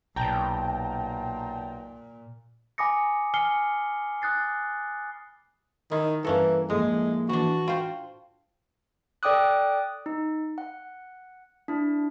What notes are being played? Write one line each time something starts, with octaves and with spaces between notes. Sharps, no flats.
B1 A#2 G5 A5 A#5
G#5 B5 D6 D#6 A#6 C#7
G#5 F6 C7 C#7 G7
D#6 F#6 A6 C7
D#3 E4
G2 E3 A#3 C#4 A4 A#5
A2 F3 G#3 A#3 E4
E3 D4 F#4
F4 C5 G5
A4 D5 G5 D6 D#6 F#6
D#4
F#5
D4 E4